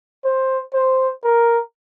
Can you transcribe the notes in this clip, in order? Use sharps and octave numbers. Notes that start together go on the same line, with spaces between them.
C5
C5
A#4